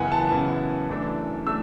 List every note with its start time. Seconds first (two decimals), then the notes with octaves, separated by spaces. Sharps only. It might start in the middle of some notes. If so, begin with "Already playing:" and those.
Already playing: F#2 C#3 E3 B3 E4 F#5 G#5
0.12 A5
0.31 F#2 C#3 E3 B3 E4
0.88 F#2 E3 A3 D4
1.47 E3 A3 D4 E6